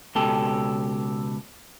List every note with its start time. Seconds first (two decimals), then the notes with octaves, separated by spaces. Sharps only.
0.15 C#2 B2 G4 A4